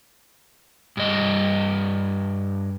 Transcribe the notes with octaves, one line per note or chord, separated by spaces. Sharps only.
G2 D#5